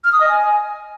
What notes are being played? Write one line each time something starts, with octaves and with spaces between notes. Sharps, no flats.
F6
D#6
D#5
G#5